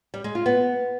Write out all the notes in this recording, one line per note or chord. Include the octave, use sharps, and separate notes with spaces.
G3
G#3
F4
B3